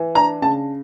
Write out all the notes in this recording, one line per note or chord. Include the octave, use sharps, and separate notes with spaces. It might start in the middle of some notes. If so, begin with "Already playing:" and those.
Already playing: E3
D4 A#5
C#3 A5